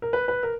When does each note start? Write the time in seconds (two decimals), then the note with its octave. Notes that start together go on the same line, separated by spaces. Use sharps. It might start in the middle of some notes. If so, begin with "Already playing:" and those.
0.02 A#4
0.13 B4
0.28 B4
0.43 A#4